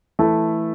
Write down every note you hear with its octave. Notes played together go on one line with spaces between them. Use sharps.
E3 A3 E4 A4